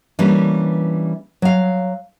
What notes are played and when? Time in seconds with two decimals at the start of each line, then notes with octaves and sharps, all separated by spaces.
0.19 E3 G3 A#3 C#4 D4
1.42 F#3 F5